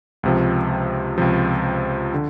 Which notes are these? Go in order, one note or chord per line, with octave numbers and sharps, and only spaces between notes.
C#2 C3 F3
C#2 C3 F3
D3